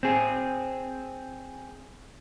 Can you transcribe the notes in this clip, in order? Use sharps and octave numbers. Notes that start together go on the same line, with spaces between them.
C4 G#4